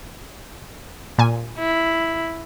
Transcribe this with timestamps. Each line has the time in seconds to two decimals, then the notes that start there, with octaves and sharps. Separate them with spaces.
1.18 A#2 G#5
1.59 E4